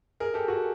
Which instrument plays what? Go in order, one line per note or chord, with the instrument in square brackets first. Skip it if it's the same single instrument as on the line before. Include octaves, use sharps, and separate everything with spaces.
[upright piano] G#4 A#4
G4 A4
F#4 G#4